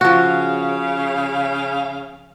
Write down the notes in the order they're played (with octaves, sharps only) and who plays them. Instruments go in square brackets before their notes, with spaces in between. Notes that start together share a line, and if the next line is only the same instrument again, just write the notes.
[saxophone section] C#3 F5 [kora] F3 F#4